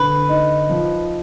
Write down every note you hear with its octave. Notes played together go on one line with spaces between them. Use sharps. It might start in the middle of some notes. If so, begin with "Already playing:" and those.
Already playing: D3 B4
D#4
F3